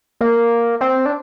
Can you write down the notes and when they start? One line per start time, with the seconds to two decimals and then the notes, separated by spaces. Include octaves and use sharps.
0.21 A#3
0.81 C4
1.06 D4